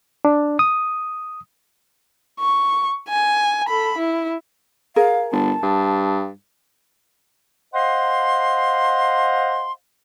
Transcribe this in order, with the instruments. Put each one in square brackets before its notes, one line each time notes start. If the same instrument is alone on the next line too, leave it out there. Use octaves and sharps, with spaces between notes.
[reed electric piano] D4
D#6
[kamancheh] C#6
G#5
A4 B5
E4
[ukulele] G#4 A#4 [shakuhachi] F5
[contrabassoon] G1 [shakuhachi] A5
[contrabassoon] G2
[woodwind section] C5 D#5 F5 F#5 C6